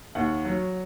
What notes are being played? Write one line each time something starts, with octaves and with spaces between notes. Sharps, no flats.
D#2 F#5
F#3